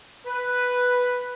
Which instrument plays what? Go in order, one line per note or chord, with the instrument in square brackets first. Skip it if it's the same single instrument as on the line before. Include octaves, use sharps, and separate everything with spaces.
[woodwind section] B4